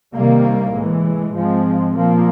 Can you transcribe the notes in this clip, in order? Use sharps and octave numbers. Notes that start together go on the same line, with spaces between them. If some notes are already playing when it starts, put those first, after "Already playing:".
C2 C3 D#3 G3 A#3
A2 E3 G#3
G#2 F3 G#3 C4
A#2 F3 A#3